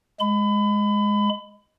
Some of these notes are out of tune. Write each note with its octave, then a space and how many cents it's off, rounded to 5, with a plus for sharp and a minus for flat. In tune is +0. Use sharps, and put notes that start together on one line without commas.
G#3 +0 B5 +30